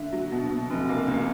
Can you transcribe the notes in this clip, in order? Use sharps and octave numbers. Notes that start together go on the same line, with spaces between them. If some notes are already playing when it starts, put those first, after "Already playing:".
Already playing: D3 E5
F#3
B2
B2
F1
A#3
C#2